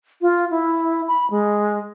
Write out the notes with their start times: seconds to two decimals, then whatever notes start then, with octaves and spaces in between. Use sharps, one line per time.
0.21 F4
0.51 E4
1.08 B5
1.30 G#3